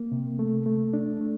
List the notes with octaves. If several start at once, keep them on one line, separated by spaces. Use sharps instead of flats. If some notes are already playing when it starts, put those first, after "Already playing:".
Already playing: A#3
C3
A3
A3
D4
A3